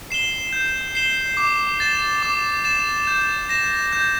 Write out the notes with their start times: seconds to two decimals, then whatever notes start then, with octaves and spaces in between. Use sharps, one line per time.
0.11 C7 E7 G7
0.53 G6
0.95 C7 E7 G7
1.37 D6
1.80 A6 E7
2.23 D6
2.64 A6 E7
3.07 G6
3.49 A#6 E7
3.93 G6